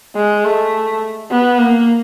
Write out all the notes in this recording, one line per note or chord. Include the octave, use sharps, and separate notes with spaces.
G#3
A3
B3
A#3